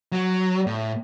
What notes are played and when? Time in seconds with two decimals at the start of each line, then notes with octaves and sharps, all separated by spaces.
0.12 F#3
0.67 A2